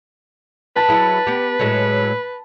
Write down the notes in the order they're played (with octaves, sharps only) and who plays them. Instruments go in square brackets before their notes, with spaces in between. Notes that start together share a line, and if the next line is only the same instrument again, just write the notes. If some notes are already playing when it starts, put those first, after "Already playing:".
[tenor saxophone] B4 [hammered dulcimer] A5 B5
[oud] F#3 E4 G#4
B3 G4
A2 F#3 G#3